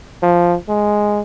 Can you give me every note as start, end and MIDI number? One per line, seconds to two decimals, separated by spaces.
0.23 0.55 53
0.69 1.21 56